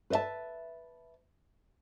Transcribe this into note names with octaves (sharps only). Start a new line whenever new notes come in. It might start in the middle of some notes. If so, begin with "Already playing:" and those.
B4 C5 D#5 E5 A5